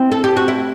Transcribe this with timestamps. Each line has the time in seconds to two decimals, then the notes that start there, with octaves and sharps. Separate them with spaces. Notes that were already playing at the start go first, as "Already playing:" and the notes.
Already playing: C4 E4
0.12 A4
0.24 G4
0.37 F#4
0.48 E4